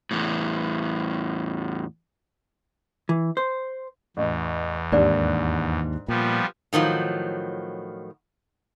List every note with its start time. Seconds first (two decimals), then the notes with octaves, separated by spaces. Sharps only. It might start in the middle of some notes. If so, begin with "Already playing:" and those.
0.11 E2 A2
3.09 E3
3.37 C5
4.17 A1 E2
4.92 D#2 G#2 G3 D4 A#4 D5
6.08 A#2 F3 G3 B3
6.73 A2 D#3 F3 F#3